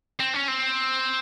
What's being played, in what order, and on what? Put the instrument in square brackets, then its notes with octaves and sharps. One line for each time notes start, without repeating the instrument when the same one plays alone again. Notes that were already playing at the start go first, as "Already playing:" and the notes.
[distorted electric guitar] C4
C#4
C4